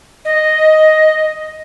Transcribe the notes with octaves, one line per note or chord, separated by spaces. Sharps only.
D#5